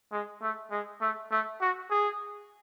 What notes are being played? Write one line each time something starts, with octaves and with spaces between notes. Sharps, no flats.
G#3
A3
G#3
A3
A3
F#4
G#4